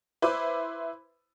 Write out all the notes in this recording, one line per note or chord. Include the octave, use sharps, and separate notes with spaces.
E4 B4 C5 B5 D6